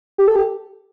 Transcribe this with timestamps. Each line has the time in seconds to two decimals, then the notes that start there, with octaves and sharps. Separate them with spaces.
0.18 G4
0.28 A4
0.35 G4